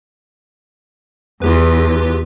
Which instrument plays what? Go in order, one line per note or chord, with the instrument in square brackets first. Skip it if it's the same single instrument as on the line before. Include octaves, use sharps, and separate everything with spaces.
[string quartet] E2 [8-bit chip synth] F4 G4 B4